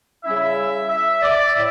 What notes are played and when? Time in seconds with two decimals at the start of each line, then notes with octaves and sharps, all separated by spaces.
0.24 C#3 G3 C#4 E4 E5
0.90 E5
1.22 D5
1.55 A2 E5